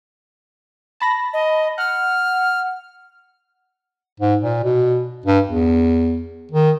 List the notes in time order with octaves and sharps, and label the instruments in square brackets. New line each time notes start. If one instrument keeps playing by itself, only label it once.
[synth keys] A5 B5 A#6
[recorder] D#5
[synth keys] F#5 [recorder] F6
[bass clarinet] G#2
A#2
B2
G2
E2
D#3